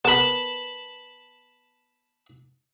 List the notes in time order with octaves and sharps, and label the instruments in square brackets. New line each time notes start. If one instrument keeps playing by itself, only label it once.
[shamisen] B3 A#4 [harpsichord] A5 B5